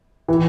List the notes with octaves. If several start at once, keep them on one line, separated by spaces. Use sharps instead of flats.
E3